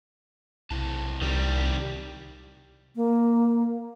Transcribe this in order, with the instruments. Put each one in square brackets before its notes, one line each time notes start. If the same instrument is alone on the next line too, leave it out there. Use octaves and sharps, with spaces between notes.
[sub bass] B1 [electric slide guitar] C3 E4 A5
[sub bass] C2 [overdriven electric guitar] D#3 G3
[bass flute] A#3